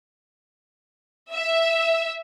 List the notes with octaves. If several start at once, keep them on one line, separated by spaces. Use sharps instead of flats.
E5